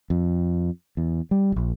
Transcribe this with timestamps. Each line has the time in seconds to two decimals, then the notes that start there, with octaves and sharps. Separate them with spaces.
0.10 F2
0.97 E2
1.31 G3
1.52 E1 A#1